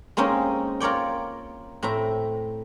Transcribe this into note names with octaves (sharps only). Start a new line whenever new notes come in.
G#3 A#3 C4 C#4 D#4
F4 A#4 C#5 D5 G5
A2 C4 E5 A#5